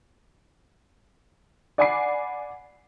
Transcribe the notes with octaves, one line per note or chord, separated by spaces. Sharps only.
D5 F#5 G#5 B5 D6 C7